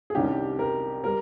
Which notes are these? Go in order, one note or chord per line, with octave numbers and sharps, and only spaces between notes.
G#4
C2 C3 D#3 G3 C#4 G4
A#4
G3 A#4